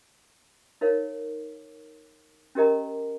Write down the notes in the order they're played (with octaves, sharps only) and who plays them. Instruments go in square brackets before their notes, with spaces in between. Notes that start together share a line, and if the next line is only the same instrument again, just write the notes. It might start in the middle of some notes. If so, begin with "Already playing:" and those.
[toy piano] D#4 A#4 C#5 F5
C#4 G4 A#4 D#5 A#5